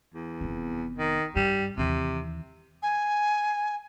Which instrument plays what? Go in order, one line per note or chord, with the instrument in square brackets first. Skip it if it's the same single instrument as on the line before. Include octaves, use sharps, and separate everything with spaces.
[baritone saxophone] E2
[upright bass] F1 B3
[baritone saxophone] D#3
[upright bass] G2 [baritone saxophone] G3
[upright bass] D#2 E3 [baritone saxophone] C3
[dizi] G#5